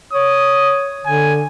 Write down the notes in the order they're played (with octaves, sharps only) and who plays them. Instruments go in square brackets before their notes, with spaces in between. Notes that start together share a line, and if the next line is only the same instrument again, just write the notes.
[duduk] C#5 [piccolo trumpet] D#6
[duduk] D3 [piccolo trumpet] G#5